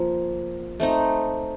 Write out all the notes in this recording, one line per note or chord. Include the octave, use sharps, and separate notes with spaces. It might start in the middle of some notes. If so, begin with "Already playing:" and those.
Already playing: F3 A#3
A3 C4 D#4